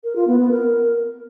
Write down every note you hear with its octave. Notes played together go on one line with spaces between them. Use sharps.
A#4
F4
B3
B3
A#4